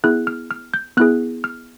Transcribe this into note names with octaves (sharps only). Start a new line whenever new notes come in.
B3 E4 G#4 F#6
F6
F6
G6
B3 E4 G#4 F#6
F6